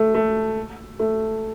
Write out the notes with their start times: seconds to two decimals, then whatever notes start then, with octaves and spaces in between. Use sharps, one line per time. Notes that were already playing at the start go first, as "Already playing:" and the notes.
Already playing: A3
0.15 A3
0.99 A3